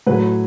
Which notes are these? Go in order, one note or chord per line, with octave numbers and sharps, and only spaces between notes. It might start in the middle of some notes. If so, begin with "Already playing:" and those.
A2 F#3 B4